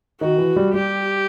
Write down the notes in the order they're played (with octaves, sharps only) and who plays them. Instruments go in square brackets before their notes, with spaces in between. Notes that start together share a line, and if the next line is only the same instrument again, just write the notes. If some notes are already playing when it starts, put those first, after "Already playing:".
[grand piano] D#3 [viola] F#4
[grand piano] E3
G3
[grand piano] G3 [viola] G4